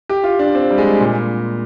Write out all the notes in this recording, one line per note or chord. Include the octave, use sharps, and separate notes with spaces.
G4
F4
D4
C4
G3
G#3
A#2